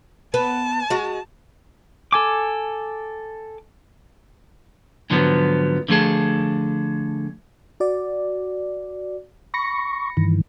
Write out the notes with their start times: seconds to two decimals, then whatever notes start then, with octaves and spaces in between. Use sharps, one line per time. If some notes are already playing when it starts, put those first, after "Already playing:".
0.34 B3 B4 A5
0.90 G#3 F#4
2.12 A4 G#5 D6
5.10 G#2 D3 F3 F#3 B3
5.88 D3 F3 A3 G#4 A4
7.80 F#4 D5
9.54 B5 C#6 A#6 C#7
10.17 G2 D#3 E3